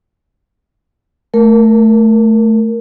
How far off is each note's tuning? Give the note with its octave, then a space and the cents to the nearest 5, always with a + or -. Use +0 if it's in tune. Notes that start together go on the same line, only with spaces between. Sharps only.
A3 +0 A#4 +0